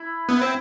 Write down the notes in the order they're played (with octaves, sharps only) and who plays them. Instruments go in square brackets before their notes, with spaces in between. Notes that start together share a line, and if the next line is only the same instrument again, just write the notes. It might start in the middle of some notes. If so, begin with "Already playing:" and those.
Already playing: [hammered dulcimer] E4
[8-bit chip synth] B3 [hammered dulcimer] E4
[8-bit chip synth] C4